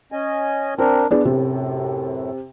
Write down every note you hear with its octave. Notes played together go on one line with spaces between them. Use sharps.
C#4 D#5 G#5
C4 D4 A#4
B3 D4 G#4
F#2 A2 C3